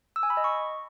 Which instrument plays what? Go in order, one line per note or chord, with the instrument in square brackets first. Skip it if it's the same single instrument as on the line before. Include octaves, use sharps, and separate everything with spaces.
[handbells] E6
G#5
B5
D#5
C#6